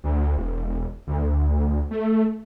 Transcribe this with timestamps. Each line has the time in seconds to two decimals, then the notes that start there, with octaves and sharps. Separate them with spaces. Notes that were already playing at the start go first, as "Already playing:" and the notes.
0.04 D2
0.37 E1
1.07 D2
1.91 A3